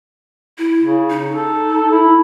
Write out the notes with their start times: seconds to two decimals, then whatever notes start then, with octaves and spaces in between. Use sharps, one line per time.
0.58 E4
0.81 C#3
1.10 D#4
1.30 A4
1.91 E4